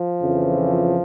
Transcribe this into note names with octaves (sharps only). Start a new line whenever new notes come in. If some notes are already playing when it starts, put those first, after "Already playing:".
Already playing: F3
F2 C#3 E3